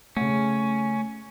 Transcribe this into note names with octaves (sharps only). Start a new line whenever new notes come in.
C#3 A3 C#4 F#5